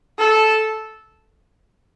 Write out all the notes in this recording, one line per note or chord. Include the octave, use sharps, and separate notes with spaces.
A4